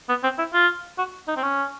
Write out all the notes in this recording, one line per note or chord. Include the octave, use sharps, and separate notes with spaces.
B3
C4
E4
F4
F#4
D#4
C4
C#4